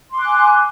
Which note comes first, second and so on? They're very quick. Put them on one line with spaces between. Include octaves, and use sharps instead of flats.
C6 D6 F#6 G#5